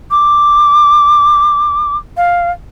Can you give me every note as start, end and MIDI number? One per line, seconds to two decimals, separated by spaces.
0.11 1.97 86
2.17 2.51 77